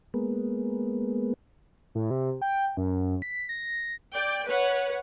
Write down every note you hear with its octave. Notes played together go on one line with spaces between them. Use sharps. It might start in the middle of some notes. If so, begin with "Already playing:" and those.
G#3 A#3 B3
A2
C3
G5
F#2
B6
A#6
D5 G5
B4 C#5 F#5